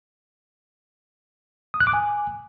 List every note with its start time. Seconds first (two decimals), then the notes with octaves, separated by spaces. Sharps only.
1.74 D#6
1.80 F#6
1.87 D6
1.93 G#5